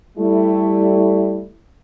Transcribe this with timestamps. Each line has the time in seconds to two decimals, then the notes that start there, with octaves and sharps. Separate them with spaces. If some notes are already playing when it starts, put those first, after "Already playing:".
0.18 G3 A3 E4